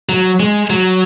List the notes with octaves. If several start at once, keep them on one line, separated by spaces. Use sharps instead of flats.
F#3
G#3
F#3